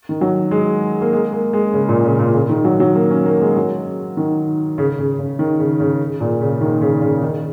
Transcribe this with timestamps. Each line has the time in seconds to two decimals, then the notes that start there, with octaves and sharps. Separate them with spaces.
0.09 D#3
0.21 F#3
0.51 G#3
1.01 A#3
1.13 G#3
1.33 A#3
1.53 G#3
1.73 C#3
1.89 A#2
2.04 C#3
2.19 A#2
2.34 C#3
2.49 D#3
2.65 F#3
2.80 F#3
2.95 A#3
3.11 C#4
3.26 A#3
3.41 G#3
3.56 F#3
4.17 D#3
4.78 C#3
4.99 C#3
5.19 C#3
5.39 D#3
5.59 C#3
5.80 C#3
6.20 A#2
6.41 C#3
6.61 D#3
6.81 C#3
7.02 C#3
7.22 D#3